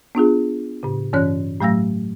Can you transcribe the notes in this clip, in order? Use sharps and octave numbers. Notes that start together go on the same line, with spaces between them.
B3 D4 F4 G#4
A2 C#3
G2 E3 C#4 C#5 F#6
A2 F#3 A3 F5 E6 A#6